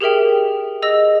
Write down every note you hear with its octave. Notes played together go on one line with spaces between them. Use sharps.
G4 G#4 A#4 E5 G5
G#4 D#5 E6 A#6